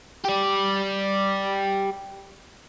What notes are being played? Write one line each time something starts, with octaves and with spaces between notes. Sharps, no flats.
G4 D5